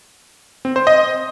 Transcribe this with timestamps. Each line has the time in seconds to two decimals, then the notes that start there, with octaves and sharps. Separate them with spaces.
0.65 C4
0.76 C5
0.87 D#5